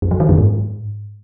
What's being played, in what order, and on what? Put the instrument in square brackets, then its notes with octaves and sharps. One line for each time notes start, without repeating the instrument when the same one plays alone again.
[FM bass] F#2
F#3
D#3
F#2
G#2